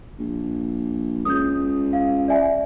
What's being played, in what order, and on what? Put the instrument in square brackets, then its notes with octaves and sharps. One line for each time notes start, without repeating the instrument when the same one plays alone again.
[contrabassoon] A#1
[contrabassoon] C#2 [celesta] D#6 G6
[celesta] F5
D5 E5 G#5